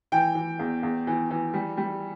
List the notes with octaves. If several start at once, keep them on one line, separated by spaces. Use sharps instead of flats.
E3 G5
E3
E2
E2
E3
E3
G3
G3